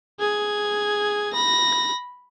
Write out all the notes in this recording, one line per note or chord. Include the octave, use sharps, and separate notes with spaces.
G#4 G#6
B5 A#6